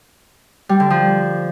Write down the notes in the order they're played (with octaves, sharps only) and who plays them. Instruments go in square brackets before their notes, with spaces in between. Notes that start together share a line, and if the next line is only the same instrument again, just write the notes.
[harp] G3
D3
F3